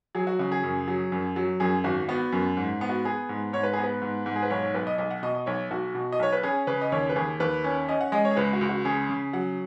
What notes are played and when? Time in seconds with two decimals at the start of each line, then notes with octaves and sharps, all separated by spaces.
0.15 F#3 G#4
0.27 F#4
0.39 C#3 F#4
0.52 G#4
0.63 F#2
0.88 F#3
1.12 F#2
1.36 F#3
1.60 F#2 G#4
1.84 G#1 F#4
2.08 B3 F#4
2.32 F#2
2.57 G#2
2.81 B3
2.89 F#4
3.05 B3 G#4
3.29 G#2
3.53 G#2 C#5
3.63 B4
3.73 B3 G#4
3.84 B4
4.02 G#2
4.26 G#2
4.36 G#4
4.43 B4
4.50 B1 C#5
4.62 C#5
4.74 B1 B4
4.87 D#5
4.98 B1 D#5
5.11 F#5
5.22 B2 D#5
5.35 D#5
5.46 B1 C#5
5.71 B1 F#4
5.95 B2
6.12 D#5
6.19 B1 C#5
6.33 B4
6.43 C#4 G#4
6.67 C#3 B4
6.81 D#5
6.92 D#2 C#5
7.10 B4
7.16 D#2 G#4
7.40 D#2 B4
7.64 C#4
7.88 C#4 D#5
8.01 F#5
8.12 G#3 D#5
8.25 C#5
8.31 G#4
8.37 C#2 B4
8.53 F#4
8.61 C#2
8.69 F#4
8.85 C#3 G#4
9.09 C#3
9.33 F#3 F#5